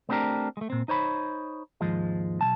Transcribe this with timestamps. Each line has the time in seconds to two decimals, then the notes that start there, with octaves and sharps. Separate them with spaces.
0.09 A3 B3 C4 D4 G4 A#4
0.57 G#3 A3
0.70 A#2 C4
0.88 D#4 C5 C#5 B5
1.81 D#2 G#2 F3 G#3
2.41 B1 F#3 A5